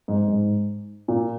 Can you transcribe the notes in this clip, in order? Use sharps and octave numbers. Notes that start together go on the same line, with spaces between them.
G#2
G#2
A#2